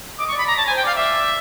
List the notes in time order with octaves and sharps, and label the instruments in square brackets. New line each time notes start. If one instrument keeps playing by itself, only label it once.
[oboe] D#5 [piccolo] D6
[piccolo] C#6
[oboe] D5
[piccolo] B5
[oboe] D5 [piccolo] A#5
[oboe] C#5 [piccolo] A5
[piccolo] G#5
[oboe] C5
[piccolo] G5
[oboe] D5 [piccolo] F5
[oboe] D5 [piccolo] E5